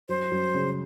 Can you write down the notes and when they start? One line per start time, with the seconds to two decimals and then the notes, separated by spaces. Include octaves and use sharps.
0.09 F#2 C5
0.31 F#2
0.54 C#3